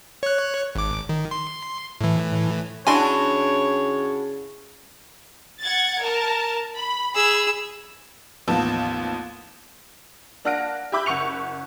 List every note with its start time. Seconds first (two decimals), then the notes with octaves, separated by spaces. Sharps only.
0.23 C#5 F#6
0.75 G#1 D6
1.09 D#3
1.31 C6
2.01 A2 E3
2.87 C#3 D4 E4 F#4 C#5 G#5 C6
5.62 F#5 G#6 A6
6.01 A#4 A5
6.77 B5
7.15 G#4 B5 E6
8.48 A1 D#2 F3 B3 A5
10.45 A#3 D4 F#5 F6 A#6 D7
10.92 G4 E5 B5 D6 E6 G6
11.06 F#1 F#5 C#6 C#7 F7